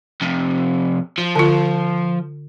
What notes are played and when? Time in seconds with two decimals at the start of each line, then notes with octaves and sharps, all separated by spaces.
0.22 F2 C3
1.18 F3
1.36 D3 F4